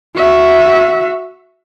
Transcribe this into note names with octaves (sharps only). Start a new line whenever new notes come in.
F#4 E5